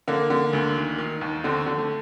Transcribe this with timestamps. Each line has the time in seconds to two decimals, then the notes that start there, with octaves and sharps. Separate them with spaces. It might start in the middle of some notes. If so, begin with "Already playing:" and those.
0.08 D3 A#3
0.30 D3
0.53 D2
0.76 D#3
0.98 D#3
1.21 D#2
1.44 D3 C4
1.66 D3
1.78 A3